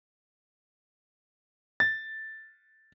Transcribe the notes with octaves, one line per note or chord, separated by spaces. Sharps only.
A6